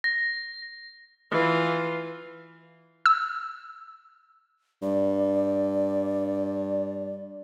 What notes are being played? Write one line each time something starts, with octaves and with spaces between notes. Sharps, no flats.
A#6
E3 F4
E6
G2 D5